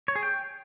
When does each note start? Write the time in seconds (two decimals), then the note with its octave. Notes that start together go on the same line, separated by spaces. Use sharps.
0.08 C#5
0.16 G#4
0.23 G5